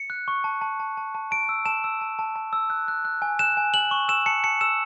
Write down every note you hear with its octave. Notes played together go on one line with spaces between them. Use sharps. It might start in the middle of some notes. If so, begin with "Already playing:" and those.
Already playing: C#7
F#6
C#6
A5
A5
A5
A5
A5
A5 D7
E6
A5 E7
E6
A5
A5
A5
E6
F#6
F#6
F#6
G#5
F#6 E7
G#5
G#5 F#7
C#6
E6 E7
A5 C#7
A5 C#7
E6 E7